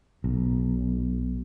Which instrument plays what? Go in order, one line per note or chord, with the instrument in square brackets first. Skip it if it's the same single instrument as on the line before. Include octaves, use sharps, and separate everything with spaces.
[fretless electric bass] B1